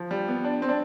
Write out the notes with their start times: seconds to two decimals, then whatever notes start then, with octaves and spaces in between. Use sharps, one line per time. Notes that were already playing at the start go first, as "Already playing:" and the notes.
Already playing: F3
0.11 G3
0.28 B3
0.45 D4
0.62 C4
0.69 D4